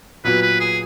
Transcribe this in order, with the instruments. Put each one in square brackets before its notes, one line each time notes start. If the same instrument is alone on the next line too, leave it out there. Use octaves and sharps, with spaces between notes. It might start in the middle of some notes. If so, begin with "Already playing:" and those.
[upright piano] A#2 F#3 B3 [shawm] B4
[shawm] B4
G#4